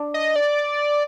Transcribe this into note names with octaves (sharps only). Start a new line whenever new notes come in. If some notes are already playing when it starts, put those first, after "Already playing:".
Already playing: D4
D#5
D5